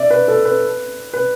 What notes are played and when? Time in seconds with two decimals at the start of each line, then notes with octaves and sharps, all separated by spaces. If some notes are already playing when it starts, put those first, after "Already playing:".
Already playing: D5 E5
0.10 B4
0.28 A4
0.45 B4
1.13 B4